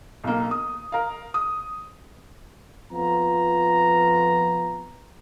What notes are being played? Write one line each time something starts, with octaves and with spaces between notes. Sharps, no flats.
B1 A#3
D#6
A#4 F5
D#6
F2 F3 B3 F4 B4 A#5